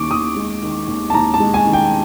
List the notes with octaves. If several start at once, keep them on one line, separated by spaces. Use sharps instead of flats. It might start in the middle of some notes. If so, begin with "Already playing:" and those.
Already playing: D#2 D#3 C#6 D6
D#2 D#6
G#3
D#3
D#2
A5
D#2 A#5
A5
G#3
G#5
D#3
G5